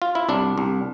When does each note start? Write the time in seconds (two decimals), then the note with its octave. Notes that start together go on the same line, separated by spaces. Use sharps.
0.02 F4
0.15 E4
0.29 C2 D4
0.58 C2